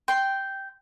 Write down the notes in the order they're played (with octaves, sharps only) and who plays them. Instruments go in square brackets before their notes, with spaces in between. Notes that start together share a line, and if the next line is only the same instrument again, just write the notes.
[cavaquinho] G5 C6